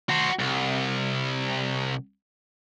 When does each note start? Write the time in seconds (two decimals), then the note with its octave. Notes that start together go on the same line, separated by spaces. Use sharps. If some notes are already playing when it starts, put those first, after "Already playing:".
0.09 F#4 C5
0.39 C2